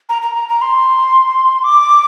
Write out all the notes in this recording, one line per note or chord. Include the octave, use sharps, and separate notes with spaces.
A#5
A#5
A#5
A#5
C6
D6